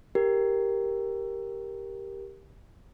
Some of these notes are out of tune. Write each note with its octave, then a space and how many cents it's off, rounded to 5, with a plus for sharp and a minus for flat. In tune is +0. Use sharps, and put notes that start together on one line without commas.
G4 +0 A#4 +0